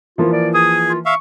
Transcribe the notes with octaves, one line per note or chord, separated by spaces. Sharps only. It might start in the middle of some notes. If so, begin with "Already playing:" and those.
E3 F3 A#3 F4
D5
G#4 D#6
F4
E5 F5 C#6